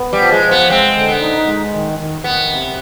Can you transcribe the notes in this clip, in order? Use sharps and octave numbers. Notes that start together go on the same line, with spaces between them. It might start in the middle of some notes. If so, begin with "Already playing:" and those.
Already playing: B3
G3
F3
G#3
F3
B3
G#3 C4
D3
B3
D#4
G#3
D#3
D#3
D#3 B3
C3